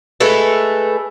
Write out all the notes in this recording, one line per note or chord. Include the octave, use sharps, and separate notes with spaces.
G#3 A3 A4 B4